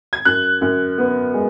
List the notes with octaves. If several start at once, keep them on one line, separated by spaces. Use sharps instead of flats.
G#6
F#2 F#6
F#2
B3
G#3